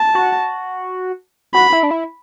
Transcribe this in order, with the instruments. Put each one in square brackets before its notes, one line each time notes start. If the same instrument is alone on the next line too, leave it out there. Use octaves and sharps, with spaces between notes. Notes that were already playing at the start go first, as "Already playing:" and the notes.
Already playing: [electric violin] A5
[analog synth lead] F#4
[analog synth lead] F#4 [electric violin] B5
[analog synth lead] E4
D4
E4